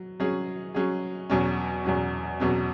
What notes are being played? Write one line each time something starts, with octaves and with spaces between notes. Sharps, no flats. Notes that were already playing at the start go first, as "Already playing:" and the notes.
Already playing: F#3
F#3 C#4 G#4
F#3 C#4 G#4
E2 B2 F#3 C#4
E2 B2 F#3 C#4
E2 B2 F#3 C#4